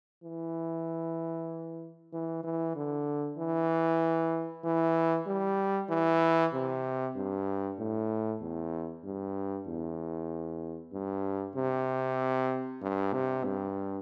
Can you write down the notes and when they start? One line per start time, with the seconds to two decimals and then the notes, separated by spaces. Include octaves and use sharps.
0.24 E3
2.13 E3
2.44 E3
2.76 D3
3.38 E3
4.64 E3
5.26 G3
5.89 E3
6.53 C3
7.16 G2
7.79 A2
8.41 E2
9.05 G2
9.67 E2
10.93 G2
11.56 C3
12.82 G2
13.13 C3
13.45 G2